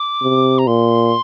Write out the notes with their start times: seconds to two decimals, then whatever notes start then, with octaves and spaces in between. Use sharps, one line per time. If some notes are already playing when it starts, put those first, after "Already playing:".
Already playing: D6
0.22 C3
0.58 A#5
0.67 A#2 C6